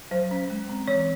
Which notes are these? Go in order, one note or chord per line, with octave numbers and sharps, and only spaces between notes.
F#3 C5
C#4
G#3
C4
E3 C#5